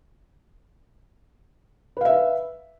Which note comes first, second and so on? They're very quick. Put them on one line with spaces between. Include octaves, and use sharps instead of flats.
B4 F5 E5